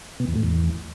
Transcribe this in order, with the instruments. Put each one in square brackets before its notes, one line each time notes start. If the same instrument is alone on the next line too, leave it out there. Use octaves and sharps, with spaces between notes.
[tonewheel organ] B2
E2
A2
E2